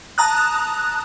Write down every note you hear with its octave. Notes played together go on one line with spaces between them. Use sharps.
A5 A#5 D#6 F#6